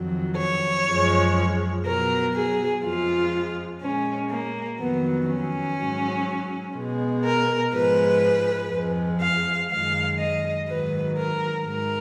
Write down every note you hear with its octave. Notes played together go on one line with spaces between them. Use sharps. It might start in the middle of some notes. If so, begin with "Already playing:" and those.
Already playing: F2 D#3 F#3
C#5
F#2 F3 G#3
B2 F#3 A#4
G#4
F2 F3 G#3 F4
A#2 G#3 C#4
A#3
F2 D#3 F#3 B3
C#4
G#2 F#3
B2 G#3
A#4
G#2 F3 G#3 B4
F2 F3 G#3
F5
F#2 D#3 G#3 F5
D#5
G#2 D#3 F#3 B4
A#4
G#2 A#4